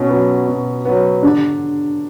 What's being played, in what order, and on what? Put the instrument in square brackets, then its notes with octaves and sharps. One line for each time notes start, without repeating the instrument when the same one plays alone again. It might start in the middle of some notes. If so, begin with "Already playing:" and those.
Already playing: [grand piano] B2 [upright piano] C#4
[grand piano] F#3 B3
B2
F#3 B3
[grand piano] D3 [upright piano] D4